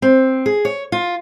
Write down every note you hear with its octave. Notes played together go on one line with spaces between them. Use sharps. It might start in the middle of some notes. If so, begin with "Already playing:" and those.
C4
G#4
C#5
F4